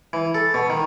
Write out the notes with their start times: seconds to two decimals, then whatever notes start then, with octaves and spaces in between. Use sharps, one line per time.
0.13 E3
0.35 A4
0.54 B2
0.70 D#3